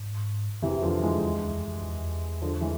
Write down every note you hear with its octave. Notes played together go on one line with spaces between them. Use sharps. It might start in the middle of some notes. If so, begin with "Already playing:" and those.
Already playing: G#2
F2 C3 E3
E2
F2 D3 F3
E3 G#3
E2
E2
F2
F2
E2
D3 F3
E3 G#3